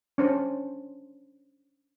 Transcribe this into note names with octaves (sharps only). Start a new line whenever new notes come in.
C#4 D4 C5